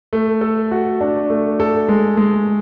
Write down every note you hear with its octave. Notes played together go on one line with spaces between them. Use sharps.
A3
A4
F#4
D4
A3
A4
G#3
G#3